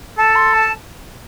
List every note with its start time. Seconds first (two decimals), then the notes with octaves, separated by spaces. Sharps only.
0.18 A4 A5
0.36 C6
0.53 A5